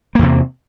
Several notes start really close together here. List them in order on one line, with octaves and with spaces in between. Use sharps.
A#3 E2 C3